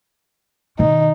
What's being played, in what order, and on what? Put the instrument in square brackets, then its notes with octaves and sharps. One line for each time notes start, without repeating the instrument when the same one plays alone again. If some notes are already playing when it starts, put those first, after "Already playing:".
[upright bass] B2 D#3 [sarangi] D#4